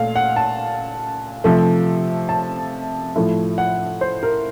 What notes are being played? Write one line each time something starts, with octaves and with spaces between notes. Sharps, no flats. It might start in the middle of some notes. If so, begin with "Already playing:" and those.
Already playing: A#2 A3 F5
F#5
A5
C3 F3 A3
A5
A2 F3 A3
F#5
C5
A#4